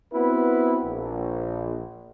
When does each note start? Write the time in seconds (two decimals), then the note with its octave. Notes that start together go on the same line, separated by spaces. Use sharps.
0.13 B3 C4 E4 F#4 B4
0.84 A#1